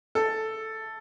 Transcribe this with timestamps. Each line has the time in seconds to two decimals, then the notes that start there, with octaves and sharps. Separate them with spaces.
0.15 A4